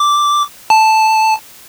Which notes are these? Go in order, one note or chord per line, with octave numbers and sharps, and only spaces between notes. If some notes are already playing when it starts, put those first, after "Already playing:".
Already playing: D6
A5